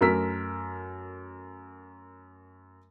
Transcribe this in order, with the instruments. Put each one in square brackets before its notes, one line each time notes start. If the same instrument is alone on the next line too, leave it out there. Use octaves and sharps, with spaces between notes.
[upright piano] F#2 A3 A#4 E6 B6